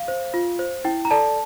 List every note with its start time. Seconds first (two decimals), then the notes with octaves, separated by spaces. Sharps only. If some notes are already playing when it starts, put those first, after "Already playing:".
Already playing: F5
0.08 C5
0.34 F4
0.59 C5
0.85 E4 G5
1.05 A#5
1.11 A4 D5 A5